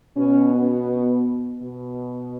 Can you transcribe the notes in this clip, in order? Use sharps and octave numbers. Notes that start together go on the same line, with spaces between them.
B2 C#4
B3
B2